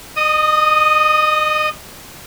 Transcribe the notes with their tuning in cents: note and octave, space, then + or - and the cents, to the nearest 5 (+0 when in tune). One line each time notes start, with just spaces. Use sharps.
D#5 -30 D#6 +0